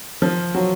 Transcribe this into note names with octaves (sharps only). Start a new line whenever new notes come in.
F3
F#3